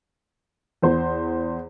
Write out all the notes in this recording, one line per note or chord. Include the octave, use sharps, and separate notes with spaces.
E2 C5